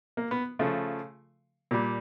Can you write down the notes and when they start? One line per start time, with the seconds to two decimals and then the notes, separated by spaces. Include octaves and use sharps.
0.17 A#3
0.31 B3
0.59 C#3 F3 A3
1.71 A#2 G3